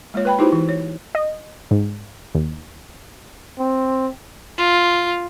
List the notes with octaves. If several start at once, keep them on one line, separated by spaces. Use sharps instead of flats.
G#3 A#3 F4 C#5
B4 G5 B5
D#4 E4 F#4 G4 B4 C5
E3
C#5
D#5
G#2
D#2
C4
F4